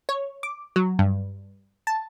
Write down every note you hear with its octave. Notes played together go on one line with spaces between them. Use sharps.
C#5
D6
F#3
G2
A5